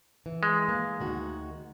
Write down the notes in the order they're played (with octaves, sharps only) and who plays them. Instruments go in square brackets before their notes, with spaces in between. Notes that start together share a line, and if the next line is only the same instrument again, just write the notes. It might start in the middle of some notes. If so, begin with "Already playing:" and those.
[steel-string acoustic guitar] E3
[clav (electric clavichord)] G#3
[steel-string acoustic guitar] A#3
D2 D#3 F#4